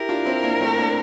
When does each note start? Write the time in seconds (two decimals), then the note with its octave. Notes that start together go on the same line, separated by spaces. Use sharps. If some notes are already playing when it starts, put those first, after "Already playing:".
Already playing: E4 G4 A#4
0.09 D4 F4
0.25 C4 E4
0.42 A#3 D4
0.61 A3 C4
0.78 A#3 D4